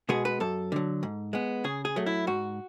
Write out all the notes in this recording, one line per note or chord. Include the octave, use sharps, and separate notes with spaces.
B2 G#3 B3 G#4
B4
F#2 A4
D3 F#3
G#2
G#3 B3
C#3 G#4
G#4
F#3 A3
E4
G#2 F#4